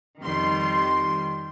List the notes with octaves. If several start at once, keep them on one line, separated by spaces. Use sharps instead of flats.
F2 D#3 G3 C6